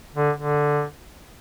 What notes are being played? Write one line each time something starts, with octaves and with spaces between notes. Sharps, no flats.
D3
D3